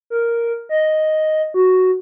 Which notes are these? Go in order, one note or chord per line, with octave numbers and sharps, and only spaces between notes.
A#4
D#5
F#4